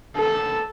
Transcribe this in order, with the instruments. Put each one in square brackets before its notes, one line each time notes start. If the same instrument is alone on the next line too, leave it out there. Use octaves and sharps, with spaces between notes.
[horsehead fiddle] A4